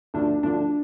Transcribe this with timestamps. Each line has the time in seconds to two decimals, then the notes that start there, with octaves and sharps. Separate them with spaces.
0.14 D2 D3 F3 D4
0.43 D2 D3 F3 D4